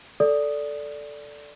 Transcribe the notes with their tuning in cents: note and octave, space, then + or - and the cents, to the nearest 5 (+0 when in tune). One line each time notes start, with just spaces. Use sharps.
A4 +0 D5 -5 D#6 +0